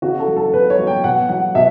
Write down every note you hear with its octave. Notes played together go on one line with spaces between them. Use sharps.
C#3 F#4
A4
F#3
A4
C#3 B4
C#5
F#3
G5
B2 F#5
F#3 F#5
B2 E5